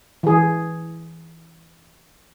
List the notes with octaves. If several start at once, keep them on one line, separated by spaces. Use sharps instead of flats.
E3 G#4